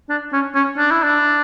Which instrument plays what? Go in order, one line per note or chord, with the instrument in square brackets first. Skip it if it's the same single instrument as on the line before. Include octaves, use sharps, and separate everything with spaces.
[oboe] D4
C#4
C#4
D4
E4
D4